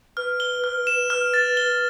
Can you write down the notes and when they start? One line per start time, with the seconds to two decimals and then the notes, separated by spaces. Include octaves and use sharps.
0.17 B4 F6
0.40 G7
0.64 F6
0.87 E7
1.10 F6
1.34 A6
1.57 G7